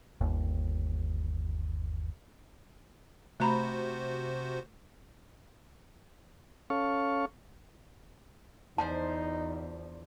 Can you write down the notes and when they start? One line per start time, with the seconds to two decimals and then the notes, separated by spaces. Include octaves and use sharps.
0.21 G1 D#2
3.40 C3 A3 F#4 C5 A#5 B5
6.70 C#4 A4 F5 C#6
8.78 E2 F3 D4 D#4 C5 A5